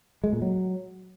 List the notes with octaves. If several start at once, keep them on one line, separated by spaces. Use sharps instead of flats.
G#3
A#2
F#3